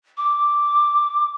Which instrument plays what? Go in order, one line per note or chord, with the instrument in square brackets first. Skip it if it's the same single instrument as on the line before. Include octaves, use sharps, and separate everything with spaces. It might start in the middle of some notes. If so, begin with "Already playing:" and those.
[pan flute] D6